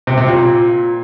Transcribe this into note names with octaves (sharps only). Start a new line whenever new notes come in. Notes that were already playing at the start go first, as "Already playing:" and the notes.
C3
C3
A#2